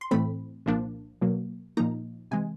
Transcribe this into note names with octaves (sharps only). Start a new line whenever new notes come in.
C6
A2 E3 A3 C4 B5
C2 A#2 F3 A#3 D4
B2 F#3 A#3
A#2 F3 A#3 D#4 A#5
C3 E3 G#3 G#5